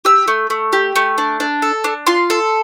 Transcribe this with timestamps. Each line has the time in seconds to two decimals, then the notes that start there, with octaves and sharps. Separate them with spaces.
0.05 G4 E6
0.28 A3
0.50 A3
0.73 G4
0.96 A3
1.18 D4
1.40 D4
1.62 A4
1.84 D4
2.07 F4 C6
2.30 A4